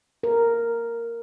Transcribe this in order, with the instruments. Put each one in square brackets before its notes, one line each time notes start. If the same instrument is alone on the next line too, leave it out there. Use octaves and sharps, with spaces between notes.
[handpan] A#4